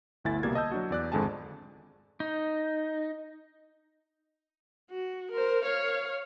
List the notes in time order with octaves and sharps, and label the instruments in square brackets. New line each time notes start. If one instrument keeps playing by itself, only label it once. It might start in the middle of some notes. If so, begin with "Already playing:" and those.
[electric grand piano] G1 D2 E4 G#5 A6
C2 B2 G3 A#3 G#6
D#5 A5 E6 G6
F#3 D4 F#4
E2 D5 F#6
G#1 F2 D3 G#3 G#5 A5
[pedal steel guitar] D#4
[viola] F#4
A#4 C5
C#5 F5